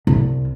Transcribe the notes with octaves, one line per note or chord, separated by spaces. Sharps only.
C2